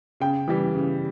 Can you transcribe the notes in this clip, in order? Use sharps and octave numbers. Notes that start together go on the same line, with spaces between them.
C#3 G5
E3 G3
C#3